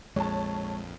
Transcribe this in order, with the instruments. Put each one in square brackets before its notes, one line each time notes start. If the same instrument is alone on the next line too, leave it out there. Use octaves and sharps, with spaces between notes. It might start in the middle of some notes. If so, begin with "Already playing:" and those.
[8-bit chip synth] A#1 F2 [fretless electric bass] G#3 [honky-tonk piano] C#5 A5